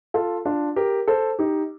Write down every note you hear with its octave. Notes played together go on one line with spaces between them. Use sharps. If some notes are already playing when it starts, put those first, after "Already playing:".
F4 A4
D4 F4
G4 A#4
A4 C5
D#4 G4